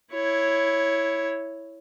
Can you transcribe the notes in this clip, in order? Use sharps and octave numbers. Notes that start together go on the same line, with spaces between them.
E4 C#5